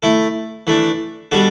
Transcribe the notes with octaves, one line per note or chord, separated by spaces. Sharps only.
A3 E4 A4
E3 A3 D4
B2 G3 D4 F#4 A4